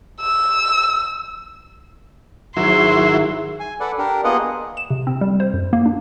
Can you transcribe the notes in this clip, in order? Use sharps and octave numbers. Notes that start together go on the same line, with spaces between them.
E6
G#1 F#3 D#4 E4 A#4 C6
G#5
A4 B4 D5 F#5
D4 G4 A#4
A#3 B3 F4 G#4 D#5 F#5
E7
C3
C4
G3
C5
F#2
A#3
D4